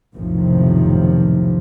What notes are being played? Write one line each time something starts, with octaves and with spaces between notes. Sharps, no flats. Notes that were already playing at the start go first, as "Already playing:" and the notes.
F1 B1 A2 C3 D#3 F3